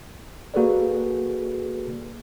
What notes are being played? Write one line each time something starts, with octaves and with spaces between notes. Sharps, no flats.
A#3 F#4 G#4 A4 B4 D5